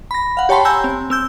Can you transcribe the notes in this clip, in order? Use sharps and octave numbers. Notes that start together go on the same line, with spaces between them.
B5 A#6
F5 F#5
G4 C#5 G5 A5 B5 C6
G#5 A#5 E6 G6
C4
C4 E6 G6